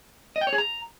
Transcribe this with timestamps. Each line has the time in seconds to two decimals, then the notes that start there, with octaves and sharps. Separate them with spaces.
0.36 D#5
0.41 G5
0.47 C#5
0.53 G#4
0.58 A#5